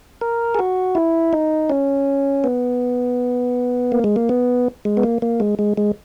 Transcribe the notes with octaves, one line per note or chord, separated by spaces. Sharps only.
A#4
G#4
F#4
E4
D#4
C#4
B3
A#3
G#3
A#3
B3
G#3
B3
A#3
A#3
G#3
G#3
G#3